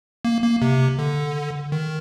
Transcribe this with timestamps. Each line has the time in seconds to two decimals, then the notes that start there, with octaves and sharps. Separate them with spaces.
0.25 A#3
0.43 A#3
0.62 C3
0.99 D3
1.72 D#3